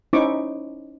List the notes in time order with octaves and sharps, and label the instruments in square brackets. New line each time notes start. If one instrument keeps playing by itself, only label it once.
[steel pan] C#4 D#4 E4 C5 C#6 D6